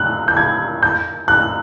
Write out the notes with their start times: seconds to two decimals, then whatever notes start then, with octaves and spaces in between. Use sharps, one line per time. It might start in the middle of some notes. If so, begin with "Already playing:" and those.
Already playing: F#6
0.28 G6
0.37 G#6
0.83 G6
1.28 F#6